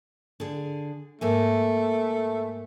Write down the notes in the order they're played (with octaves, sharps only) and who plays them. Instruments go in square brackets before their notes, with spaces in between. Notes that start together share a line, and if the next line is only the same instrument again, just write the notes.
[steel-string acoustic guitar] D3 G#4
[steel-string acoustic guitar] G#2 A#3 G#5 [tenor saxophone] A3